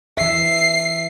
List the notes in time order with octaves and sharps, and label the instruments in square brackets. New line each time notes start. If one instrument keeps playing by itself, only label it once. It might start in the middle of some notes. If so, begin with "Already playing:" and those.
[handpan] E3 E5 [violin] C7